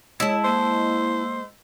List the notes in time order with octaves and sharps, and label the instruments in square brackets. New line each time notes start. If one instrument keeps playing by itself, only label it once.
[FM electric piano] G#3 D#5 E6 [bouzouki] E4 A5 [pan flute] C#5
[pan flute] A#3 [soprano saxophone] C5